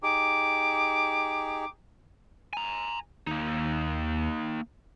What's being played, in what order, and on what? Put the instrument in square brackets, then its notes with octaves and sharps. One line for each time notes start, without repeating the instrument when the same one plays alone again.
[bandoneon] D#4 G4 G#4 [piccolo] D6
[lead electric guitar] G#5 A#5
[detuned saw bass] D#2 [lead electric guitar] A#3 D#4